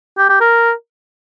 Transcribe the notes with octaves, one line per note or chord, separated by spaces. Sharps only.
G4
G4
A#4